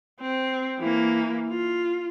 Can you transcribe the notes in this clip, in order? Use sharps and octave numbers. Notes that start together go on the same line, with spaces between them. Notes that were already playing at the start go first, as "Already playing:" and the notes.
C4
E3 A#3
F4